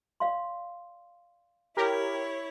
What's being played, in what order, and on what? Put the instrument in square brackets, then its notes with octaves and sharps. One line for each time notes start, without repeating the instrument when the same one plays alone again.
[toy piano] D5 F5 C6
[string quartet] E4 C#5 [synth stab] G4 A#4